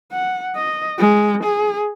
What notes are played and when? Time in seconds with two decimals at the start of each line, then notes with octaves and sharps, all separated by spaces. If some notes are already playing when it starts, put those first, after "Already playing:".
0.12 F#5
0.56 D#5
0.99 G#3
1.44 G#4